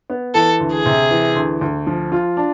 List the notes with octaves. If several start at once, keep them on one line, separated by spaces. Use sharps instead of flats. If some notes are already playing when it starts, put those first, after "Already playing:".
B3
E3 A4
D2
G#4
C3
E3
D2
D2
F3
F4
D4